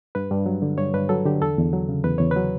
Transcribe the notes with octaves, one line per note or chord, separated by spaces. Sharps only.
G2 B4
G2
F#3
D3
G2 C#5
G2 B4
F#3 A4
D3 G4
E2 A4
E2
F#3
C#3
E2 B4
E2 C#5
B4
F#3